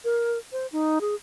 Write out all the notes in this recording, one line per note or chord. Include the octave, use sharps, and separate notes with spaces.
A#4
C5
D#4
G#4